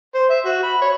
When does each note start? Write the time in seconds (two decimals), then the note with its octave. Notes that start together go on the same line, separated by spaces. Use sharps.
0.15 C5
0.30 E5
0.45 F#4
0.63 B5
0.81 C#5